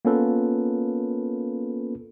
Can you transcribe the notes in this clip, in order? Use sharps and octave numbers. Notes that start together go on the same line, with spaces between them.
A#3 B3 C#4 F4 A4 B4